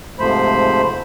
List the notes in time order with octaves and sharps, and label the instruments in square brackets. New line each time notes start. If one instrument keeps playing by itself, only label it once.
[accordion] G#2 C3 F3 A3 C5 B5